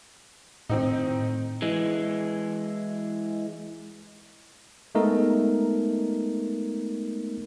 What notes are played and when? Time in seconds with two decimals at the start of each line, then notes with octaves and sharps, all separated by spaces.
0.69 A2 D#3 C4 D#4
1.62 E3 G#3
4.95 G#3 A3 B3 D#4 A#4 D#5